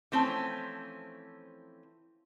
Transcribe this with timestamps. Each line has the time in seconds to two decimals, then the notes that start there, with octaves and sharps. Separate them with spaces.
0.12 E3 F3 A3 C4 C#4